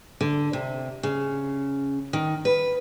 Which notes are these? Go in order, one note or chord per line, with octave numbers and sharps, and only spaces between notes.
D3
C3
C#3
D#3
B4